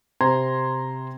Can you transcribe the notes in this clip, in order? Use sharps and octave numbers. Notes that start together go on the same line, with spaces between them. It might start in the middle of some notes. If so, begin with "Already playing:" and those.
C3 C5 A#5 C6 G#6